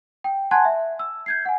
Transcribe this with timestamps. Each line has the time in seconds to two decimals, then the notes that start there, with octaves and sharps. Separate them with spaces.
0.24 G5
0.51 F#5 G#5 A5 C6 F#6 G#6
0.65 E5
0.99 E6
1.26 G6 G#6 C7
1.45 F#5 G#5